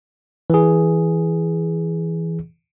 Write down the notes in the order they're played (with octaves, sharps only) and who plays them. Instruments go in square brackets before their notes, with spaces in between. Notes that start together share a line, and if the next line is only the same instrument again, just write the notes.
[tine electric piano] E3 G#4